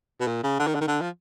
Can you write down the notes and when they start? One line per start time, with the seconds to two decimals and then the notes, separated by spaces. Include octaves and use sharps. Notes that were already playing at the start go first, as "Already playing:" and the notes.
0.20 B2
0.27 A#2
0.43 C#3
0.59 D3
0.67 D#3
0.75 D3
0.81 D#3
0.88 D3
1.01 F3